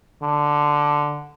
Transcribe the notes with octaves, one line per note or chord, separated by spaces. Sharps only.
D3